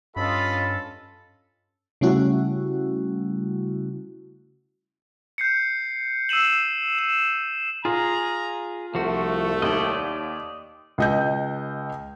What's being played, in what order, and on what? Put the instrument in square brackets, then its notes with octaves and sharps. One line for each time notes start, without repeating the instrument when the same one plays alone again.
[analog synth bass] G2 [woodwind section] C#4 A4 [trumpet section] F4 D#5 [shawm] B5
[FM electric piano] C#3 G3 A3 C#4 E4 F#4
[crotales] G6 C7 C#7
E6 C7 D#7 E7 F#7
E7
[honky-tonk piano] F4 [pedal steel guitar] G#4 [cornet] A#5
[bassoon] C2 [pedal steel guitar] F3 F#4 [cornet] A3
[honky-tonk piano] D#2 [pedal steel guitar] D5 D#5
[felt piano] C#2 D#5 G6